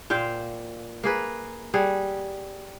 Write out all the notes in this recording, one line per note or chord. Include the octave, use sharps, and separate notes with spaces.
A#2 C5 F5 G5
A#3 G#4 B4
G3 G#4 F#5